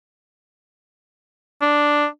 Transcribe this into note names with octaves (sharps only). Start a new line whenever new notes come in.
D4